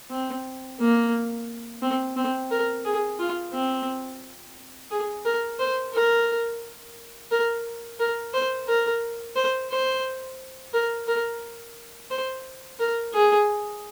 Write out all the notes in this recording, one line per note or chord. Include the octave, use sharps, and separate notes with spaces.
C4
A#3
C4
C4
A#4
G#4
F4
C4
G#4
A#4
C5
A#4
A#4
A#4
C5
A#4
C5
C5
A#4
A#4
C5
A#4
G#4